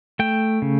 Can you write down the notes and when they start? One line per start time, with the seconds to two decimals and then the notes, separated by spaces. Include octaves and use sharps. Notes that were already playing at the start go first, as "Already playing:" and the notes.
0.19 A3 G5
0.62 C#3